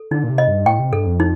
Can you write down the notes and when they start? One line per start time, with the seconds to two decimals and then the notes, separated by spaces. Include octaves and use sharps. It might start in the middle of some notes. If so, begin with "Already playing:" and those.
Already playing: A4
0.11 D3 D#4
0.24 A#2
0.30 C3
0.38 D#5
0.48 G2
0.66 A2 G5
0.79 C3
0.92 G2 A4
1.06 F2
1.20 D#4